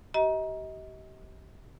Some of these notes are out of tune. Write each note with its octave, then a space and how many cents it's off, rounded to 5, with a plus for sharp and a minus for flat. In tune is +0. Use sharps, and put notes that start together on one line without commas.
G4 -35 D#5 +35 A#5 +25